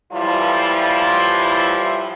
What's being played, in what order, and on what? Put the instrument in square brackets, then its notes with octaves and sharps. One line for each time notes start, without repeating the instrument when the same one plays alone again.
[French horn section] A2 E3 F3 G3 E4 F4